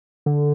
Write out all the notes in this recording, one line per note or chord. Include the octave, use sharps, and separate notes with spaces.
D3